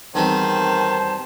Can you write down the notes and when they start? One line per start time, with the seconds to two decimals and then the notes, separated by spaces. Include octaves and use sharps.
0.15 E2 D#3 G3 C4 C5 A5